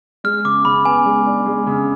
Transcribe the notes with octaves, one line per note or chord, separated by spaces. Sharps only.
G#3 F6
C#3 D6
C#3 B5
B3 G#5
G#3
D4
G#3
C#3